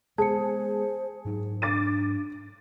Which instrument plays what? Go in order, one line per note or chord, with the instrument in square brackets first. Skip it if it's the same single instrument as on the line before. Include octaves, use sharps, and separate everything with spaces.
[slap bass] G#3 B3 [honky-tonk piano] G#4 [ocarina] C5 [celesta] A5 C#7
[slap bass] G#2 F#3 [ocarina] D#4
[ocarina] D4 [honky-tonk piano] D6 A6 D#7